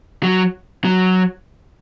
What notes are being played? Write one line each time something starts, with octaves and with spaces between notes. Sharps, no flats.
F#3
F#3